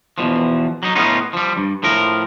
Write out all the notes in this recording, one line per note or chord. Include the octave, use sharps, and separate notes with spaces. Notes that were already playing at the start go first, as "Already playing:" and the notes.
E2 B2 F3
F#3 D#4
A2 B3 C#4 D#4 F4
F3 G3
G2
A2 F3 A#4